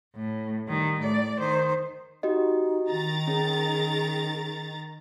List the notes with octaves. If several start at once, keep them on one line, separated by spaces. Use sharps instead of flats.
A2
D#3 G3
A2 D5
D#3 C5
D#4 F#4 G4 D#5
D#3 A#5 A6
C#4 G#4